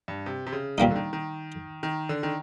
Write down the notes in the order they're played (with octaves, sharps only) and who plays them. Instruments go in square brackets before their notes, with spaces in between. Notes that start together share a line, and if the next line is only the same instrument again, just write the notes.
[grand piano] G2
C3
C3
C#3
[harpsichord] A#2 G3 A#3 D#4 [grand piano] D#3
[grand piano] D3
D#3
D#3
D#3
D3
D#3